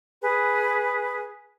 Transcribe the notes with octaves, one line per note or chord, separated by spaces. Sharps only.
G#4 B4